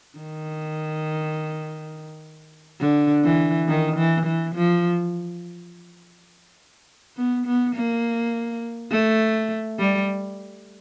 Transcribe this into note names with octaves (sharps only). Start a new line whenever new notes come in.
D#3
D3
E3
D#3
E3
E3
F3
B3
B3
A#3
A3
G3